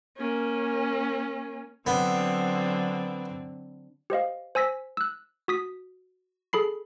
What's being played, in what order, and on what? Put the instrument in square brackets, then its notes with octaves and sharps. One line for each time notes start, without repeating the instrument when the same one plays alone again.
[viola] A#3 C#4
[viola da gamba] D3 F#3 C4 [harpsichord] B3
[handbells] G4 C5 D#5 F5
C5 G#5 E6 A#6 B6
E6 F#6
F#4 D#6 B6
G#4 A4 B5 C7